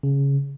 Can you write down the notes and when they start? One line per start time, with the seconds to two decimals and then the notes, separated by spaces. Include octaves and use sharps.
0.03 C#3